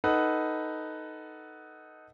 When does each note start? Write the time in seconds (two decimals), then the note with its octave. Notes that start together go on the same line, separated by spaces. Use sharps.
0.04 D#4 A4 B4 F#5